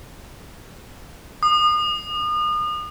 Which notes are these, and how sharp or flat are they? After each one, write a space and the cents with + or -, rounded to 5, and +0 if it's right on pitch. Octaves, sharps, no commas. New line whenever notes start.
D#6 -35